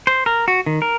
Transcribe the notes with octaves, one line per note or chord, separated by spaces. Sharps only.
C5
A#4
F#4
D#3
A#4